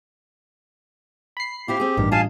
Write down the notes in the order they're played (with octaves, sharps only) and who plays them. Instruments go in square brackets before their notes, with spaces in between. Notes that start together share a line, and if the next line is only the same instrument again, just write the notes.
[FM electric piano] B5 C7
[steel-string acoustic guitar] C4 E4 F4 [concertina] G4
[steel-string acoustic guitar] C4 G#4
[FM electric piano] A1 G2 [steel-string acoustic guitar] D#3
[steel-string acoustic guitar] F4 D#5 [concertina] F5 G#5 A5